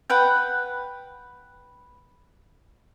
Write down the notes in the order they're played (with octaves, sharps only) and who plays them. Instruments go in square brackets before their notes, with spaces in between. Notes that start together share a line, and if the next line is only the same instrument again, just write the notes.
[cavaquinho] B4 F#5 G5